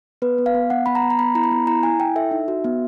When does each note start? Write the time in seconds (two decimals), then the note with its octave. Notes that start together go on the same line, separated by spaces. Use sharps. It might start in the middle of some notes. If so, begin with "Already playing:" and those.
0.22 B3 B4
0.38 B3
0.46 F5
0.54 B3
0.70 B3 F#5
0.86 B3 B5
0.95 A#5
1.03 B3
1.10 A#5
1.19 B3 B5
1.35 E4 A#5
1.44 B5
1.51 B3
1.67 E4 A#5
1.83 E4 G#5
1.99 E4 G5
2.16 A4 E5
2.31 D#4
2.48 F#4
2.64 B3